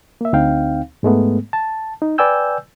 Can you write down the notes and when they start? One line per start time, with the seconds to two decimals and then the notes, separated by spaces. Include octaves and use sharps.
0.21 A#3 E5
0.33 D2 C4 D#4 F5 G5
1.03 G#2 G#3 A3 B3
1.53 A5
2.02 D#4
2.18 B4 D5 G5 G#5 E6 G6